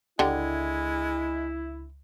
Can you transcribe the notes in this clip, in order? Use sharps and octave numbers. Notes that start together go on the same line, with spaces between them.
C#2 D3 G#3 E4 G4